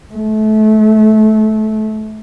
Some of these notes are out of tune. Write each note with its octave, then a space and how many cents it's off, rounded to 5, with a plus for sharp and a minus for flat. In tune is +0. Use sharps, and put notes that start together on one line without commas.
A3 -25